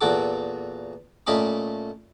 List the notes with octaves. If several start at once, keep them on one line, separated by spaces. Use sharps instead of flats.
E2 A#2 F#4 A4 D6
A#2 A3 C#4 D#5 B5 D6